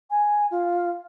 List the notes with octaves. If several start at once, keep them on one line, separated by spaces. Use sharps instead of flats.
G#5
F4